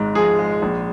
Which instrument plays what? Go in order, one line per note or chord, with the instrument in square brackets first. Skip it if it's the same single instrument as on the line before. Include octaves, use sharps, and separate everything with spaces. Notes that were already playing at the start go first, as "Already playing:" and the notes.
Already playing: [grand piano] G#1 G#2
F3 G#4
G#3
A#1